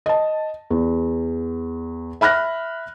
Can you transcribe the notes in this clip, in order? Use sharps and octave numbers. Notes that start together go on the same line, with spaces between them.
D#5 A5
E2
E5 B5 F6 F#6 A#6